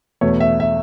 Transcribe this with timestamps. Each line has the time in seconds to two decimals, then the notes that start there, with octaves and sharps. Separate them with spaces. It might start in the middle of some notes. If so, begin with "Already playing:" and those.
0.21 E2 B2 A3 C#5
0.40 E5
0.60 E5